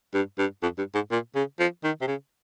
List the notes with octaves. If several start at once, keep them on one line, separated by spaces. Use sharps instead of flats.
G2
G2
F2
G2
G#2
A#2
C#3
F3
D#3
C3
C#3